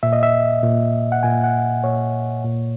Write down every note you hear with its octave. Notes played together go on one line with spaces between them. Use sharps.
A#2 E5
D#5
E5
A#2
F#5
A#2 G#5
F#5
A#2 C#5
A#2